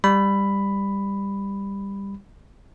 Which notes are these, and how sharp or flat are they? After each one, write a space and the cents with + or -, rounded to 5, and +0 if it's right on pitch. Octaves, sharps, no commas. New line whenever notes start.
G3 +15 B5 +5